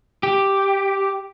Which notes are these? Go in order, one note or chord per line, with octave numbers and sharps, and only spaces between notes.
G4